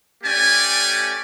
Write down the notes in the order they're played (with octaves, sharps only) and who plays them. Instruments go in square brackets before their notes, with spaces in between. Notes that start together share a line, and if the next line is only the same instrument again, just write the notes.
[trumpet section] A3 C#4 G4 D5 G#5